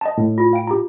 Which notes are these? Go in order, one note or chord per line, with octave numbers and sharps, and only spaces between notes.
D#5 A5
A2
F4
F5 G5 D7
G4 A#5